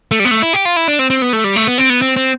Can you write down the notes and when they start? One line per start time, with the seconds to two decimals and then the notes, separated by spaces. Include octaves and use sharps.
0.11 A3
0.20 G3
0.25 B3
0.31 A3
0.42 E4
0.53 G4
0.65 F4
0.76 E4
0.88 D4
0.99 C4
1.10 C4
1.22 B3
1.33 A3
1.44 G3
1.56 A3
1.67 B3
1.78 C4
1.90 B3
2.02 C4
2.16 C4